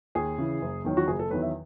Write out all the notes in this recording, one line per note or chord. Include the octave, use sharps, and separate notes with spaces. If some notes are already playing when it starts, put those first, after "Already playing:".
D#2 G#4
C#3 E3
F#1
E2 D#3 F#3
F#4
F#1 G#4
A4
E2 D#3 F#3 B4
E5